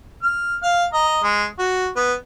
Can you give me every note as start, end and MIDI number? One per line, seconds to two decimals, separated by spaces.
0.23 0.55 89
0.63 0.85 77
0.63 0.85 89
0.93 1.21 75
0.93 1.21 82
1.23 1.46 56
1.59 1.88 66
1.96 2.13 59